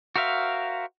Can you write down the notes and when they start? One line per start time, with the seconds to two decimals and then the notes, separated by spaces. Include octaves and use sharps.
0.16 F#4 A#4 C5 E5 F5